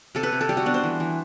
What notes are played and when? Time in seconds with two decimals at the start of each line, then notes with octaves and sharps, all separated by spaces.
0.15 C3 A4
0.23 B4
0.32 C3
0.41 A4
0.49 G3 G4
0.57 F#4
0.66 B3 D4
0.74 C5
0.83 E3
1.00 E3